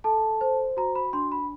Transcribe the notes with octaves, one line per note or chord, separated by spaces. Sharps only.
A4 A5
C5
F#4 A#5
B5
D4 C6
B5